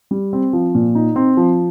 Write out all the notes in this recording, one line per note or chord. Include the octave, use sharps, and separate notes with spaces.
G3
C4
F3
A#2
D#4
C4
F3